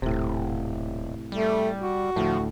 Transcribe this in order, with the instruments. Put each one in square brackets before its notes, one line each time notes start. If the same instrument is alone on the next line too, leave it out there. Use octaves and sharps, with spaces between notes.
[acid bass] D#1 [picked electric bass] A2 C3
[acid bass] G3 [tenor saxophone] A3
[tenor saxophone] F#4
[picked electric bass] D2 A2 [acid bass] F3